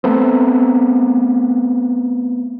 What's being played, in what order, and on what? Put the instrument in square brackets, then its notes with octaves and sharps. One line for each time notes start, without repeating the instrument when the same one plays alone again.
[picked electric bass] A3 B3 C4